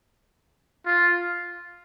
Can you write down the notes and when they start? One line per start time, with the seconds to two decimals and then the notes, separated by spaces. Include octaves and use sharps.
0.86 F4